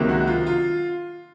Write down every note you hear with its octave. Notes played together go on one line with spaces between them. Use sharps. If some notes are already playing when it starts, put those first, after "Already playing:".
Already playing: C#2 C3 D#3 F#3 A#3
F#4
F4
F4